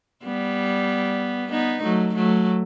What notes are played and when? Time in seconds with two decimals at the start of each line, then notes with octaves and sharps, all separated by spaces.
0.23 G3 B3
1.50 B3 D#4
1.82 F#3 A3
2.14 F#3 A3